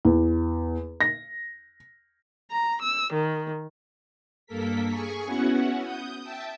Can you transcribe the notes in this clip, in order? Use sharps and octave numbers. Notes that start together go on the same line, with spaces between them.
E2
A#6
A#5
E6
D#3
G2 A#3 A4 A#4 B6
G#4 G#5 C#6
B3 C#4 E4 F#4 F#5
D#6 G6
E5 G5 A5